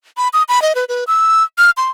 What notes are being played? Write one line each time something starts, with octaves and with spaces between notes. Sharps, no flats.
B5
D#6
B5
D#5
B4
B4
E6
F6
C6